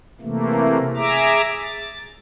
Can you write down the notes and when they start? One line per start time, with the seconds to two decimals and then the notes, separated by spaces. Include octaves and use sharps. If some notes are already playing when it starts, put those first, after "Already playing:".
0.21 C3 E3 A3 A#3
0.96 G#4 E5 A#5 D6
1.62 A6